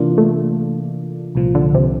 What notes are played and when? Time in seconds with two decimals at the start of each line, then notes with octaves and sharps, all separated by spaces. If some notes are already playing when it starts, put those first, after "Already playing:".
Already playing: C3 E3 A#3 D4 F4
0.18 A3
1.35 C2 A#2 F3
1.55 D3
1.74 C3